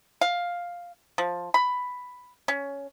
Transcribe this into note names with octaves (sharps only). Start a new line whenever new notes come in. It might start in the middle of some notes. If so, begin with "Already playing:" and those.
F5
F3
B5
C#4